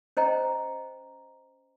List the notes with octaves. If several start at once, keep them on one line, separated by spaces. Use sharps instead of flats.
C#4 C5 D#5 G5 A#5